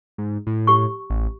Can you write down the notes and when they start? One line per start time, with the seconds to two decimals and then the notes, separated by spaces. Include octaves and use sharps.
0.18 G#2
0.47 A2
0.67 G4 C#6
1.10 A1